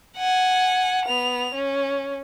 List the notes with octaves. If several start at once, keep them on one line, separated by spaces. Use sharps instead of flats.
F#5 G#5
B3 F7
C#4